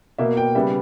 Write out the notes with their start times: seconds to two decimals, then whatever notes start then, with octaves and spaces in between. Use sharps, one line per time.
0.18 B2 A#3 E5
0.37 G5
0.55 C#3 G3 B3 E5